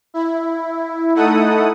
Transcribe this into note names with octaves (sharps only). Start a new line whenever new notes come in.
E4
A3 D#4 E4 A4 F#5 D#6